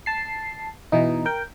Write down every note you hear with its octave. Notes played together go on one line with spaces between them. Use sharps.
A5 C7
B2 E3 D#4
A#4 G5